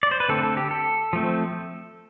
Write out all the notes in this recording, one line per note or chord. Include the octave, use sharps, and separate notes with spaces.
D5
C5
B4
D3 A3 C4 A4
A4
G4
A4
F3 A3 C4